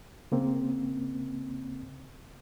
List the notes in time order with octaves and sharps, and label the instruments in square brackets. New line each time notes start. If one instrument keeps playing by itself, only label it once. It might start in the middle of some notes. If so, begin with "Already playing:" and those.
[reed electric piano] C#3 A#3 C4